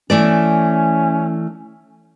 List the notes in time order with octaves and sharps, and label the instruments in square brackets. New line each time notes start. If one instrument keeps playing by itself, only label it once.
[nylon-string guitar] E3 A3 D5 [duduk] C#4